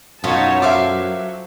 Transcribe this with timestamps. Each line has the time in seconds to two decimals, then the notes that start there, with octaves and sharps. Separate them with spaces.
0.24 F#2 B2 B3 D#4 F4 C#5 A5
0.62 F#3 A4 C5 E5 F5 D6